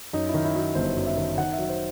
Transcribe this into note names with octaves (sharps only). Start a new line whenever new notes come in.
F#2 D#4
E4
D#3
E4
F#3
G1 C5
F#2
E5
D#3
D#3 F#5
E5
F#3
C5